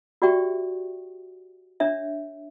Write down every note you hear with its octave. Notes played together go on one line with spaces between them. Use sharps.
F#4 G4 D5 E5 G5 C#6
D4 C#5 E5